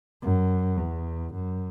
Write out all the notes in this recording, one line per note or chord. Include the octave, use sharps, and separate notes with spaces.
F#2
E2
F#2